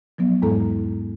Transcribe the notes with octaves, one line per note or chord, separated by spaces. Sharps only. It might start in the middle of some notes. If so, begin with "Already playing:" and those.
F3 F#3 B3
E2 G#2 G#3 A4 A#5